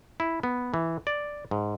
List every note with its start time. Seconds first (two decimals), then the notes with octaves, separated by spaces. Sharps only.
0.20 E4
0.43 B3
0.74 E3
1.07 D5
1.51 G#2